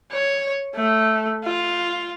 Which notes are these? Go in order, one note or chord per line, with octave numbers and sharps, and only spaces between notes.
C#5
A3
F4